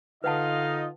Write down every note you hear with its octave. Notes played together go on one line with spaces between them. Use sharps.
D3 D#4 F4 B4 D#5 F5 F#5 A5